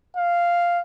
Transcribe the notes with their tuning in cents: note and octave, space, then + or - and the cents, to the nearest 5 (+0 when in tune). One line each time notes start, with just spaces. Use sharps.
F5 -5